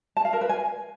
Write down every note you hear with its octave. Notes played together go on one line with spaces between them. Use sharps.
A5
F5
A#4
B4
G#5